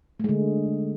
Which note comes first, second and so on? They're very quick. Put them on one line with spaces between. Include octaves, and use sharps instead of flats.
A3 G#3 D3